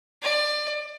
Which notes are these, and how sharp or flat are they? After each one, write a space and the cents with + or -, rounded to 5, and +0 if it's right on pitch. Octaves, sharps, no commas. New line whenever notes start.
D5 +25